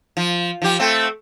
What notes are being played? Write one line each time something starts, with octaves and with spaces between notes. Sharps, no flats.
F3
F3 G4
A3 C4